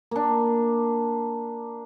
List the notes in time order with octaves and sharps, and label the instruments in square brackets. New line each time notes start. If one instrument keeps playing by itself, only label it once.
[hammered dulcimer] A#3 D4